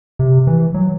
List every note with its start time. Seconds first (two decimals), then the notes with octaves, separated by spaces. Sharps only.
0.19 C3
0.47 E3
0.74 F#3